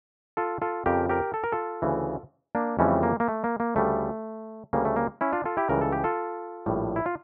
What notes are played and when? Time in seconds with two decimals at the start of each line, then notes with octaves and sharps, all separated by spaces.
0.37 F4 A4
0.62 F4 A4
0.86 F2 C#3 F3 G4 A#4
1.09 G4 A#4
1.34 A4
1.44 A#4
1.52 F4 A4
1.82 D2 C#3 E3
2.55 A#3 D4
2.79 F2 C#3 E3 G3 A3 C#4
3.03 A#3
3.20 A#3
3.28 A3
3.44 A#3
3.60 A#3
3.76 D2 C#3 G3 A3
4.73 D2 C#3 G3 A#3
4.85 A3
4.96 A#3
5.21 C#4 E4
5.33 D4 F4
5.45 F4 A4
5.57 E4 G4
5.69 C#2 C#3 E3 G3 A#4
5.81 A4
5.92 G4
6.04 F4 A4
6.66 A#1 A2 G3
6.96 E4
7.06 F4